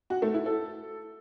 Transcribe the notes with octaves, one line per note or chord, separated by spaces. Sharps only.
F#4
A3
E4
A4